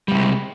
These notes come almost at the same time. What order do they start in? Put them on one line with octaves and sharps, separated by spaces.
G3 A2 C3 G#3